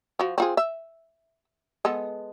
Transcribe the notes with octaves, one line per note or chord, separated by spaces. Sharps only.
F3 F#4
C4 F4 G#4
E5
G#3 B3 A4